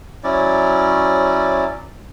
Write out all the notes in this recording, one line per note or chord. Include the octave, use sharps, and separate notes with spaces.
F#3 C#4 E4 D5